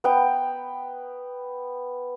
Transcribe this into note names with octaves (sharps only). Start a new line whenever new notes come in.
B3 G5